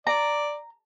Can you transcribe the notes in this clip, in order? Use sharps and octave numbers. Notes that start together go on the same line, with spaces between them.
D5 A#5